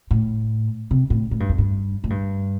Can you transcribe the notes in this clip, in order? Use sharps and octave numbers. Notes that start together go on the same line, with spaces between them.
A2
C3
A2
A2
G2
F2
G2
A2
G2